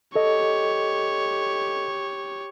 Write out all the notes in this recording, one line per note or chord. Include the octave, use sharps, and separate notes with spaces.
G4 A4 C#5 D#5